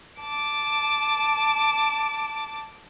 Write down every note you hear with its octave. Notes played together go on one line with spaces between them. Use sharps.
A5 D6